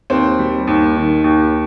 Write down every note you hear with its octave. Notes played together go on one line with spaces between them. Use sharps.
D#2 C4
G3
D#2
D#3
D#2